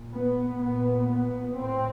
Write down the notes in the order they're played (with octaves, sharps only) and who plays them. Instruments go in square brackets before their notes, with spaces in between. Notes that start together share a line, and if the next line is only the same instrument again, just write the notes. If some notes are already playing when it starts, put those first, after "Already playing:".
Already playing: [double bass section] A#2
B3
A#2 B3
B3
A2 C4